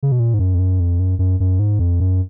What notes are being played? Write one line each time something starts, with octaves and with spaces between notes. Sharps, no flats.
C#3
B2
A#2
G#2
F#2
F2
F#2
F2
F#2
F#2
F#2
G#2
F2
F#2